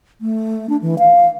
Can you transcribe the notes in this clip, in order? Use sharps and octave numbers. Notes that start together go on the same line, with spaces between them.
A3
D4
E3
F5